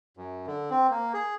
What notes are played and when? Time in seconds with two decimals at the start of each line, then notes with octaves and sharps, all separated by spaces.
0.17 F#2
0.47 D3
0.70 C4
0.90 A#3
1.14 G#4